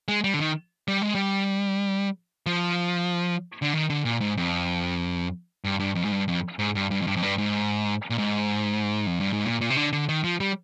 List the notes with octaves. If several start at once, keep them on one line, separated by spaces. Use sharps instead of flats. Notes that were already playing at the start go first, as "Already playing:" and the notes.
G#3
G3
D3
D#3
G3
G#3
G3
F3
D3
D#3
D3
A#2
G#2
F2
G2
G2
F2
G#2
G2
F2
G#2
G2
G2
F2
G2
F2
G2
G#2
A#2
G#2
F2
G2
G#2
A#2
A#2
C3
D3
D3
D#3
F3
G3